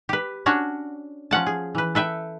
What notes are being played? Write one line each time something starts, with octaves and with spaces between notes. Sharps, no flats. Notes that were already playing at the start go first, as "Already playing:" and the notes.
G4 B4
C#4 D4 F#4 C#5
F3 C#4 F#5 A5
G#4
E3 B4
A4 B4 E5 G5